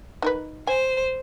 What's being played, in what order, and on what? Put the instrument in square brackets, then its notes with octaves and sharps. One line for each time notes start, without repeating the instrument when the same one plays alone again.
[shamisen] D#4 A#4 B4
[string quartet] C5 [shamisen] G#5